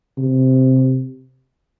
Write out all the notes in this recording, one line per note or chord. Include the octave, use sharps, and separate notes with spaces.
C3